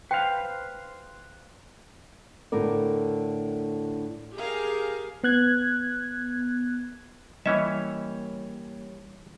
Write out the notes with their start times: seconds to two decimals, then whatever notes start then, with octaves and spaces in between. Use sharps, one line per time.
0.11 B4 C5 F5 G5
2.52 A2 D3 A#4 D5
4.36 G4 G#4 A#4 F5
5.24 B3 F#6 G#6
7.46 E3 G3 A#3 C#4 C#5 D#5 E5